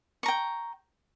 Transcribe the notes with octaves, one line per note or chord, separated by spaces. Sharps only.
G5 A#5 C#6